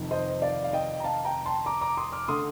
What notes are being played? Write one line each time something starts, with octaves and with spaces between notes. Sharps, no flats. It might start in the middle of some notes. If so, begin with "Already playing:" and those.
Already playing: F1 F2 D#3
C5 D#5
D5 F5
F5
D#5 G5
A#5
F5 A5
G5 A#5
A5 C6
A#5 D6
A#5 D6
C6 D#6
D6 F6
D3 A3 C6 D#6